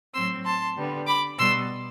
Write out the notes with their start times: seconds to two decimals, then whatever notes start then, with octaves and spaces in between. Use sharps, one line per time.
0.14 A2 F#3 C4 C6 E6
0.45 A5 C6
0.76 D3 G3 B3
1.07 B5 D6
1.38 B2 G3 B3 C6 E6